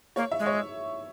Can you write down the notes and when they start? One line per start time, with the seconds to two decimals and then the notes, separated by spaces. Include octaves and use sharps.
0.16 A#3 C#5
0.32 E5
0.39 G#3
0.46 C#5